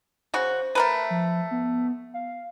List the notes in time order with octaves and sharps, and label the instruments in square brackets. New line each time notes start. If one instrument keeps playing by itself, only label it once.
[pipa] C#3 F#4 [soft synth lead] C5
[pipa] A3 A#4 B4
[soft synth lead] F3
B3
F5